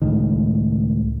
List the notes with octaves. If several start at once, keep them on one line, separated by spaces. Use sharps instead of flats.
C#2 A2 D#3